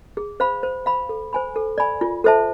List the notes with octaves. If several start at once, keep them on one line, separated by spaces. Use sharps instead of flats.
G#4
C5 F5 B5
C5
F5 B5
A4
C5 G#5 B5
A4
D5 G#5 B5
F4
A4 C5 E5 A5